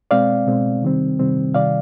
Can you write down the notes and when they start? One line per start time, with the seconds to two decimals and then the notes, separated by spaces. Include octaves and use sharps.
0.11 B2 G#3 C4 D5 F5
0.47 B2 G#3 C4
0.82 C3 D#3 G3 C4
1.19 C3 D#3 G3 C4
1.54 C3 D#3 G3 D5 F5